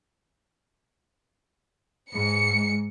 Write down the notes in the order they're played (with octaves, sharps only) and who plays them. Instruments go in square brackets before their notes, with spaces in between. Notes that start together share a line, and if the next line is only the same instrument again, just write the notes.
[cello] G#2 [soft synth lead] G#3 [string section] C#7